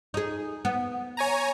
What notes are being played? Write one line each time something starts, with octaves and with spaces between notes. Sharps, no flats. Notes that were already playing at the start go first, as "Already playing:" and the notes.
D#4 G#4
B3
C#5 G#5 A#5